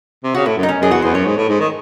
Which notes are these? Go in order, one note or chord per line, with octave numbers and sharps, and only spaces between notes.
C3
C#3 F#4
A2 E4
F#2
D#4
C#4
F#2 G#4
E2 F#4
E2 C5
F#2 C#5
G#2
A2
G#2
D#3